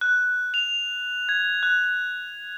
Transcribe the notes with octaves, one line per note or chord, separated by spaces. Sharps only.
F#6
F7
G#6
F#6